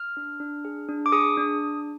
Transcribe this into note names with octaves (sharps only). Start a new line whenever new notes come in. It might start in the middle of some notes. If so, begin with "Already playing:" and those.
Already playing: F6
D4
D4
G#4
D4
D6
G#4 D#6
D4